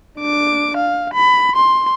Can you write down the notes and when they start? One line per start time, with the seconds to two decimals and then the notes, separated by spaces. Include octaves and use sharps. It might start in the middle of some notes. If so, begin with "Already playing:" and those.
0.20 D4 D6
0.77 F5
1.14 B5
1.56 C6